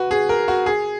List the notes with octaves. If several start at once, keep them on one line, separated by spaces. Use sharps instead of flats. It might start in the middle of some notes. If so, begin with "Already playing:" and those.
Already playing: F#4 B4
G#4
A#4
F#4
G#4